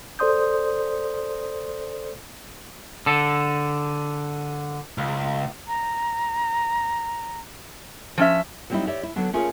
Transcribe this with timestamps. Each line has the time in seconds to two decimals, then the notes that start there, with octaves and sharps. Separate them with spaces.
0.19 A4 C5 D5 C6 D#6 G6
3.06 D3 A4
4.98 C#2
5.68 A#5
8.18 F3 C#4 E5
8.70 F#3 G3 C4 C#4 D#4 E4
8.87 G4 C#5 D5 E5
9.03 E4
9.16 D3 F#3 B3 D4
9.33 A3 C#4 F4 G#4 A#4 C#5